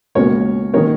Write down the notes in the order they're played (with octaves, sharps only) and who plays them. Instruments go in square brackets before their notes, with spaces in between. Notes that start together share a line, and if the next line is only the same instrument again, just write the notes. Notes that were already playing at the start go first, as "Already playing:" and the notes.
[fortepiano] C#2 B2 A#3 C#4 A#4 C#5
D#3 A#3 C#4 A#4 C#5